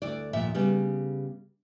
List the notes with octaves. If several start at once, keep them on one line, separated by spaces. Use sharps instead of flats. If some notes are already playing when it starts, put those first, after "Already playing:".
D2 E4 D5
D#2 A#2 F3 E5
C#3 G3 B3